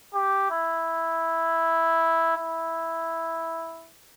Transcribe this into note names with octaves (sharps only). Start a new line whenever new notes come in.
G4
E4
E4